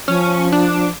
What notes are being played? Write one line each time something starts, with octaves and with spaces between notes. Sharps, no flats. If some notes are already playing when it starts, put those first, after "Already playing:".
F3 C#4
D4